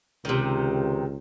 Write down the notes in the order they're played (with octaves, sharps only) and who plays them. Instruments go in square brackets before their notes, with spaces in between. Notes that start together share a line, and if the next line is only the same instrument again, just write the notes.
[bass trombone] C#2 [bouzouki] C3 D#3